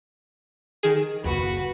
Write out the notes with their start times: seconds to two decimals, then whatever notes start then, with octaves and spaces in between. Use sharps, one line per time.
0.83 D#3 G#4
1.24 F#1 D#2 F#4 B4